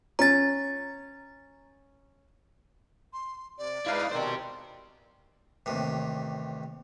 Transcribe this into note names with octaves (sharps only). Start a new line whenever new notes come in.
C#4 A#5 A6
C6
C3 D5
G#2 E4 B4 D#5 F5
B2 D#3 C4 G4 C5
A1 D#2 C3